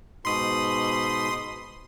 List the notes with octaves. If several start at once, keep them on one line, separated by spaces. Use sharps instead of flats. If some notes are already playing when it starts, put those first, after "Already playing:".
G#2 B2 B5 C6 D#6